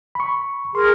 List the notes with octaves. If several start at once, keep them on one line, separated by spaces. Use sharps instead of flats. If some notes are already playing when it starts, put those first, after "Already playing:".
B5 C#6
G#4 A#4 C6